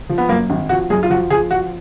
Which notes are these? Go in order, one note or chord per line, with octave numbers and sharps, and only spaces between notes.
F3
B3
F#2 A#3
G#1
F3 F#4
F#2 G#4
F4
F3 F#4
F3 G#4
F3 F#4